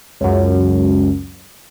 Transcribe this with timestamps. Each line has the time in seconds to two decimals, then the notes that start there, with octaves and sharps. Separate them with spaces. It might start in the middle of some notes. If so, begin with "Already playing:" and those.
0.21 C#2 F#2